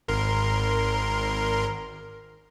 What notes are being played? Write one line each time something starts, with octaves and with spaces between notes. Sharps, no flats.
G#1 A#4 C6